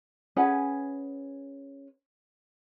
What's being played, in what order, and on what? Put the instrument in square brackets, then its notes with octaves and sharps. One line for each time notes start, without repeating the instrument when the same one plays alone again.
[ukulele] C#4 G#4 B4 F#5